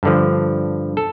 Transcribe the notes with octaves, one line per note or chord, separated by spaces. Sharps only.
G2 D3 F3
A4